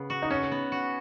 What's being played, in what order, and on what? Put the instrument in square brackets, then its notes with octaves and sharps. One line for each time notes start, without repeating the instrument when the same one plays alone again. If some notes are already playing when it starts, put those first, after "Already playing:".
Already playing: [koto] C#3 B3
F#4
[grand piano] D#4
[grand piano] C#4 [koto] F#4
[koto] B3
F#4